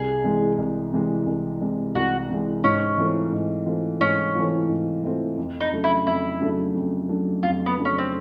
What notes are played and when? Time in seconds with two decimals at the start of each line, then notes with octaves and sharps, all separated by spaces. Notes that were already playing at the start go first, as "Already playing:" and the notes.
Already playing: C2 G#4
0.24 C3 E3 G#3
0.58 C2
0.93 C3 E3 G#3
1.26 C2
1.61 C3 E3 G#3
1.95 C2 F#4
2.30 C3 E3 G#3
2.64 G#2 C#4
2.98 E3 A3 C4 F4
3.32 G#2
3.66 E3 A3 C4 F4
4.00 G#2 C#4
4.35 E3 A3 C4 F4
4.69 G#2
5.04 E3 A3 C4 F4
5.38 F2
5.60 D#4
5.72 C#3 F#3 A3 D4
5.84 E4
6.06 F2 E4
6.41 C#3 F#3 A3 D4
6.74 F2
7.09 C#3 F#3 A3 D4
7.43 F2 F4
7.66 B3
7.78 C#3 F#3 A3 D4
7.85 C#4
7.98 C4